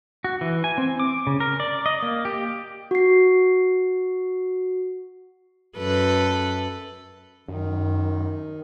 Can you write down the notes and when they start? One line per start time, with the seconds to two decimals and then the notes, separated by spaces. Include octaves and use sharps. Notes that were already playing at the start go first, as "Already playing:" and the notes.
0.24 F#4
0.41 E3
0.64 G#5
0.78 C4
0.99 D6
1.27 C#3
1.40 A#4
1.60 D5
1.86 D#5
2.03 A#3
2.25 G4
2.91 F#4 C7
5.78 F#2 A4 B4
7.48 F#2 D#3